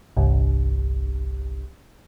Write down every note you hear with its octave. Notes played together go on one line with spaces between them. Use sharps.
G1 C2